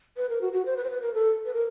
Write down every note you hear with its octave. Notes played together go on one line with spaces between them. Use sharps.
B4
A#4
F#4
F#4
C5
B4
C5
B4
A#4
A4
B4
A#4